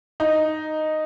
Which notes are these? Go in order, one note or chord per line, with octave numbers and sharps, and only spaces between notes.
D#4